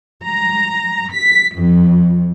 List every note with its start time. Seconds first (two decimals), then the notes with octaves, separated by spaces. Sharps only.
0.23 A#5
1.11 B6
1.56 F2